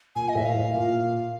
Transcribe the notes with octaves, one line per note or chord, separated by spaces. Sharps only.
A#2 G#5
D#5
A2 E5
F5
A2
A#2